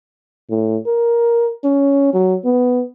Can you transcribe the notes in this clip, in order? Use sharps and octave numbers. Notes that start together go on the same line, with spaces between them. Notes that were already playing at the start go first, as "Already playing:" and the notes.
A2
A#4
C#4
F#3
B3